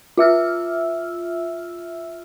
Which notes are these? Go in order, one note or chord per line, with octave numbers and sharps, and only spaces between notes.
F4 E5 E6 F6